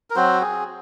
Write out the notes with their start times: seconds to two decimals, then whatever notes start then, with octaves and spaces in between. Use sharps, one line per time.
0.10 A#4
0.16 F#3 C4 F#4 C5
0.41 G#4